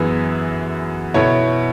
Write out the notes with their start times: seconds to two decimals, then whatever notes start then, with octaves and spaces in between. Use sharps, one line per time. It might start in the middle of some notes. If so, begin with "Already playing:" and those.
Already playing: F#2 E3 B3 E4 G#4
1.14 B2 B3 E4 C#5